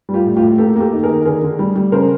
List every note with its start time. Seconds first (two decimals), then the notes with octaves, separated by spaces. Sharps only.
0.09 G3
0.14 F4 G4
0.26 A2
0.37 F4 G4
0.42 A2
0.58 A#3 G4 A4
0.76 A#3 G4 A4
0.93 D#3
1.03 G#4 A#4
1.09 D#3
1.25 D3 G#4 A#4
1.42 D3
1.59 G3
1.76 G3
1.92 C#3 A#4 C5